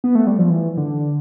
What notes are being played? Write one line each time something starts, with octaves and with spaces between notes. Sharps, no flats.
B3
A3
G3
F3
E3
D3